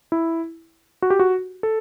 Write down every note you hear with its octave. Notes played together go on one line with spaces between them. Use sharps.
E4
F#4
G4
F#4
A4